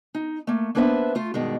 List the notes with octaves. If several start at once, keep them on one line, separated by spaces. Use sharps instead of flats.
D#4
A3 A#3
A#3 B3 D4 B4 C5 E5
A3 F4
G2 B2 D#3 G#3